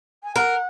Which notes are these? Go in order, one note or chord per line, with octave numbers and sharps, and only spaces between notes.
G#5
A#4 F#5